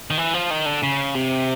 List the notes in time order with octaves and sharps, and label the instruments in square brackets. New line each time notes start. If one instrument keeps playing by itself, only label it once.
[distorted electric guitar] D#3
E3
F3
D#3
D3
C#3
C3